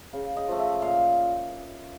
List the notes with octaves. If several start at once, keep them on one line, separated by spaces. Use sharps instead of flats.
C#3 F5
D#5
F3 A3
E5
A#2 F5